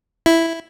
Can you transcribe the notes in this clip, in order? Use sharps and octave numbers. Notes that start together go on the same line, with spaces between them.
E4